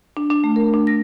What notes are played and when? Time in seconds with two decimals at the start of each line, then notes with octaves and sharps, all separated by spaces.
0.17 D4
0.30 D4
0.44 A3
0.56 A#4
0.74 D4
0.87 A#6